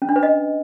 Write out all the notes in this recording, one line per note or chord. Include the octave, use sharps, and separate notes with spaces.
C#4
D4
B4
D#5